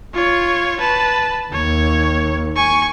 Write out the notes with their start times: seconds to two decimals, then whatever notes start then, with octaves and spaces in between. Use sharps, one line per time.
0.14 F4 C#5
0.80 B4 A5
1.53 D#2 C#5
2.56 G#5 C#6